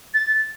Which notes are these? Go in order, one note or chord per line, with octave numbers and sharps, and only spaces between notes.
A6